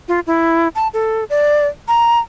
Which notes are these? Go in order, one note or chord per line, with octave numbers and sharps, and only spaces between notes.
F4
E4
A5
A4
D5
A#5